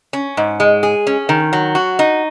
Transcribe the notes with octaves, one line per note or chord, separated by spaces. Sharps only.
C#4
G#2
G#3
G#4
C#4
D#3
F#3
F#4
D#4